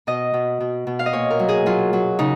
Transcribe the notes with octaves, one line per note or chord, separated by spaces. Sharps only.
B2 D#5
B2
B2
B2
F5
D#5
A#2 C#5
A#4
F#3
G#4
F#3 F4
F#3
C#3 D#4